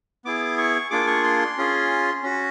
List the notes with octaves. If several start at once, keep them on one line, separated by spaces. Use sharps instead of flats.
B3 E4 G#4 D6
C#6
A#3 D4 F4 G#4 D6
C#6
C6
C#4 F4 G#4
C#4 F#4